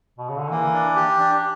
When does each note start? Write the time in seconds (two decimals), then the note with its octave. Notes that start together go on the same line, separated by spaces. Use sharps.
0.18 B2
0.29 C#3
0.39 D3
0.51 E3 A#3
0.73 D4
0.96 G4
1.19 D4